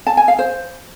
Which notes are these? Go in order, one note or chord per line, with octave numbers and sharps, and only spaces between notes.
A5
G#5
F5
C5